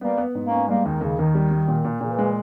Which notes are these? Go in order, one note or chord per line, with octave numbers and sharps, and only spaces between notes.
G3 A#3 B3
B3
G#2
A#3 C#4
B3
G3 G#3 A#3
D#2 D#3
D#2 C#3
D#2 D#3
G3
G3
A#2
A#2
A#2 C#3 E3
G#3